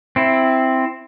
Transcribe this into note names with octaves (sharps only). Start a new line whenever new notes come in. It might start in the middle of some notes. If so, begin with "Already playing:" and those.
C4 E4